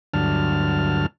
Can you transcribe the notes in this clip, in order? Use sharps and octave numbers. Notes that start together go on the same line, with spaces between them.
D2 G2 D3 F#3 A5 F6